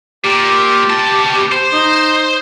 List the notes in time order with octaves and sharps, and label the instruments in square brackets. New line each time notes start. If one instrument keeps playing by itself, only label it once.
[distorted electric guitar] A#2 [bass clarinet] G4
[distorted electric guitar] B2 A5
C5
[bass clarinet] D#4